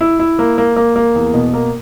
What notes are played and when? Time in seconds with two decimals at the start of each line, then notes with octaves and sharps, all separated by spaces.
0.01 E4
0.19 E4
0.39 A#3
0.58 A#3
0.76 A#3
0.96 A#3
1.15 E2
1.34 B2
1.54 A#3